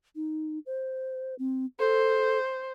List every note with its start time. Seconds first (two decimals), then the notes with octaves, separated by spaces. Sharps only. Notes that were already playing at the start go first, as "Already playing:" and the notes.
0.16 D#4
0.66 C5
1.39 C4
1.79 A4 C5